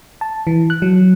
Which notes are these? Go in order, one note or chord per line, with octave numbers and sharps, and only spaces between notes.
A5
E3
F#6
F#3